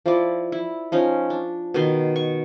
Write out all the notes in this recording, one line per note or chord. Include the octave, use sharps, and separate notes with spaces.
F3 E4 D5
E4
F3 C#4 D#4
D4
B2 D#3 C6
C#6